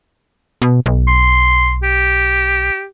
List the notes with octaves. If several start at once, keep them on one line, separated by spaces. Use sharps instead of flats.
B2
B1
C6
G4